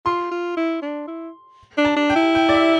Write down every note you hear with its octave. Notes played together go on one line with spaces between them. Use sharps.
F4 C6
F4
E4
D4
E4
D4
A5
D4
G5
E4
G5
D5
E5